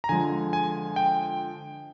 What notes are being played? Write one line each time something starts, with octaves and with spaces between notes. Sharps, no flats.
A#5
D3 F3 G#3 G#5
G#5
G5